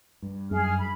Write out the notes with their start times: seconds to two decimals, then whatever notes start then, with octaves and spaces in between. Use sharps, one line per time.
0.22 G2
0.51 F#2 G#4 F6
0.77 B5